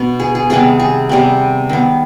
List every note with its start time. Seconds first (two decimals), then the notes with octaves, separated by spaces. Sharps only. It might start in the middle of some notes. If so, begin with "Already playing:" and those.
Already playing: B2 B3 D4
0.20 G#4
0.35 G#4
0.50 C3 D#3 G3 B3 G#4
0.79 G#4
1.09 C3 G3 B3
1.69 D#3 B3